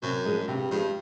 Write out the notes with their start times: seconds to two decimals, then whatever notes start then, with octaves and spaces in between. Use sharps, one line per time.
0.03 F#2 C3
0.25 F3 G#3
0.48 G2 C3
0.71 G2 F3 G#3